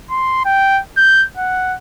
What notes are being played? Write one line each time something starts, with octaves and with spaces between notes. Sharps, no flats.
C6
G5
G6
F#5